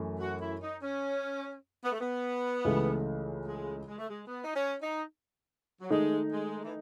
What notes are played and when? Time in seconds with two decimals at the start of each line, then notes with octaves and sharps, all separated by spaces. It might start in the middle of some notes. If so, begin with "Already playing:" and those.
Already playing: F#2 E3 A3
0.20 F#4
0.40 E4
0.61 D#4
0.81 C#4
1.83 B3
1.92 A3
2.00 B3
2.65 C#2 C#3 E3 A3
3.46 G#3
3.87 G#3
3.98 A3
4.08 G#3
4.28 B3
4.43 D#4
4.55 C#4
4.81 D#4
5.80 F#3
5.90 D#3 G#3 A3 D#4
6.31 G#3
6.63 E3